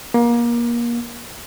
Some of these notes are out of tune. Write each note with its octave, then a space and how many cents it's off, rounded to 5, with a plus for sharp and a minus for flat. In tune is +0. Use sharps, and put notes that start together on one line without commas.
A#3 +30